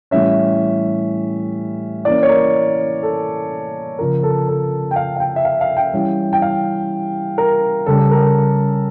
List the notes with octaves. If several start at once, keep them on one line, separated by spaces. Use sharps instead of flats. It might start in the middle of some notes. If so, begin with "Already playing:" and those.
A2 E3 G3 C#4 E5
E3 A#3 C#4 D5
C#5
A#4
A4
C#3 F3 C#4 A#4
A4
A4
G5
F5
F5
G5
E5
F5
F5
G5
E3 G3 C#4
G5
F5
A#4
C#3 G3 C#4 A4
A#4